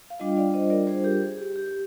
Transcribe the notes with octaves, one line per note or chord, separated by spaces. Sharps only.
F5
G3 D4 F4 D#5 G5
D5 F5
C5 D#5
A#4 D5
G#4 C5
G4 A#4
G#4
G4
G4